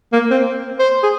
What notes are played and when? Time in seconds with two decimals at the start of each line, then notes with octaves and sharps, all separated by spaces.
0.13 A#3
0.31 C4
0.79 C5
1.03 G#4